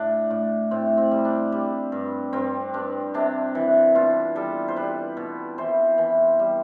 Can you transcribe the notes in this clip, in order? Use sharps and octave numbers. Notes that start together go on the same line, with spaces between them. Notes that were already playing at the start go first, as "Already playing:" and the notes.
Already playing: A2 D4
A2
A2 C4
C4
G3
D4
G3
G2
G2 C4
G2 D4
C3 D4
E3
B2 F4
G3 A4
C5
G3 B4
B2
E3 C5
E3
G3